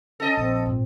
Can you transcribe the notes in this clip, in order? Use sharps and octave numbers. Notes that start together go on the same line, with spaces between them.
C#4 A4 D#5
A#1 C4
G#1 A#2